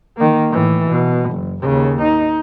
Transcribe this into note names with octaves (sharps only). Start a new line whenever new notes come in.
D#3 A#3
A2 E3
B2
F#1
D#2 C#3
D#4